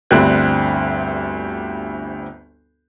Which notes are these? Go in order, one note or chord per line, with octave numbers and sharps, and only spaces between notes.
G1 D2 G3 C4 F#6